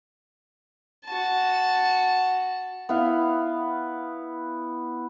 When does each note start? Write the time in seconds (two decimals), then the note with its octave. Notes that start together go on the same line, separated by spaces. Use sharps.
1.06 F#4 A5
2.89 B3 E4 F5